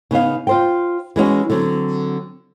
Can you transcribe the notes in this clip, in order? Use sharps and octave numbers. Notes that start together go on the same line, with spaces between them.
C#3 B3 D#4 F5
F4 C5 G5
E3 G#3 C#4 F#4
D3 F#3 C4